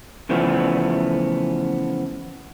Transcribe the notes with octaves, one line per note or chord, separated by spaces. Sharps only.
C#3 E3 F3 A3 B3